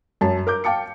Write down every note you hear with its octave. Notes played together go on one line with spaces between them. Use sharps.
F#2 A5
A#4 D6 G6
F5 G5 A5 D6 C#7